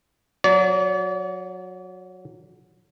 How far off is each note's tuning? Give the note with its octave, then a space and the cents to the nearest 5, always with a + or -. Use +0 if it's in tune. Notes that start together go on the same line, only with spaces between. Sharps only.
F#3 -15 D5 -40